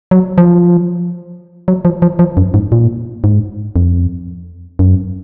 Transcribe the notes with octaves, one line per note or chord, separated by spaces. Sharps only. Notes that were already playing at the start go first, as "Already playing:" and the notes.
F#3
F3
F#3
F3
F3
F3
F#2
G#2
A#2
G#2
F2
F#2